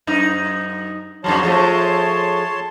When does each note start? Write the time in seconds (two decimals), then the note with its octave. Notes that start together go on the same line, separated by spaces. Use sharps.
0.07 F#2 D#4
1.24 F2 G#2 F#3 C#5 A5 C6
1.43 F3 G#3 A3